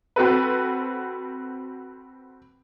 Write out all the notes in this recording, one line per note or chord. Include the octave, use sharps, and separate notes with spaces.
C4 F#4 A4 B4